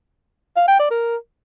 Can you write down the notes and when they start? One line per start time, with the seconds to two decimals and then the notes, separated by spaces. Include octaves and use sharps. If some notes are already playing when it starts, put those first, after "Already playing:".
0.57 F5
0.68 G5
0.79 D5
0.91 A#4